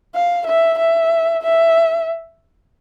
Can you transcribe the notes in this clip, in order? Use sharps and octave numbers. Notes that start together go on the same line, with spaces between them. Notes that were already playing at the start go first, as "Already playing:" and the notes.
F5
E5
E5
E5